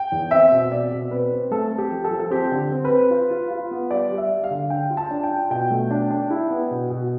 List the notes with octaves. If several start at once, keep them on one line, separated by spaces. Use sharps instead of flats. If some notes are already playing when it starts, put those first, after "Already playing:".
Already playing: G5
E2
C4 E5
B2
C4 D5
B2
C4 B4
C4
A3 A4
C4
G4
F3
A4
F3
A4
C4 G4
D3
C4
B4
C4
F4
F4
F4
B3
G3 D5
G3
E5
G3
F5
D3
D4 G5
F4
A5
D4
G5
F4
B2 G5
A3
D4
D4
E4
B3
B2
B2